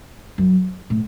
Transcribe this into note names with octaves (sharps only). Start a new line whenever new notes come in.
F#2
A2